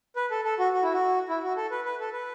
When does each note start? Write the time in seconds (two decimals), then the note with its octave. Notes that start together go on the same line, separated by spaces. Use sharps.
0.16 B4
0.31 A4
0.45 A4
0.59 F#4
0.73 F#4
0.83 E4
0.94 F#4
1.29 E4
1.43 F#4
1.57 A4
1.71 B4
1.85 B4
2.00 A4
2.13 B4